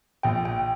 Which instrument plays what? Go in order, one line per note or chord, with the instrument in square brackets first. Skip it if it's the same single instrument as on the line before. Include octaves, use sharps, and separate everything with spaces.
[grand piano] A#1 [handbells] G5
[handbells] G5